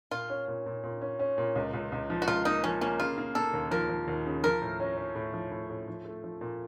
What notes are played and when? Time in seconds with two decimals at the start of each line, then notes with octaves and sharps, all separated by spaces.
0.11 A#2 F4
0.30 C#4
0.48 A#2
0.66 A#2
0.83 A#2
1.01 C#4
1.19 C#4
1.38 A#2
1.56 C#2
1.74 C#2
1.92 C#2
2.10 F3
2.22 F#4
2.28 C#2 F4
2.45 A#3 D#4
2.64 F3 C#4
2.81 A#3 C#4
3.00 C#3 F4
3.18 A#3
3.35 A#3 A4
3.54 D#2
3.71 F3 A#4
3.89 F3
4.08 D#2
4.26 C#3
4.44 F3 A#4
4.62 A2
4.80 C#4
4.97 C#4
5.15 A2
5.33 F3
5.51 A2
5.70 A2
5.88 F3
6.05 A3
6.24 F3
6.41 A#2